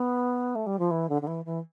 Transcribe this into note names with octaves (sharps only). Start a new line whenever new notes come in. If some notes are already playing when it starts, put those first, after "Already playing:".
Already playing: B3
A3
G3
F3
E3
D3
D3
E3
E3